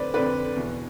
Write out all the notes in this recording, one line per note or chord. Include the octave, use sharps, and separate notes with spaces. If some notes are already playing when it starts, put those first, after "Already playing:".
Already playing: F2 D3 B4 C5 D5
F2 D3 B4 D5
E2 B2